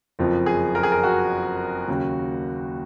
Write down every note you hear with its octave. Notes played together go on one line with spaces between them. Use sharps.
F#1 F2 F3
G#4
A#4
G#4
A#4
F#4
D#2 C#3 F#3